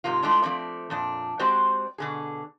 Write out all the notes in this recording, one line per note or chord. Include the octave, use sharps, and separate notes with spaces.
G#2 C3 A#3 F4
A2 G#3 A3 D4 F4
F3 A3 C4 D5
F2 A#2 D4
G#3 C4 F#4 G4 C5 D5
B2 D3 G#4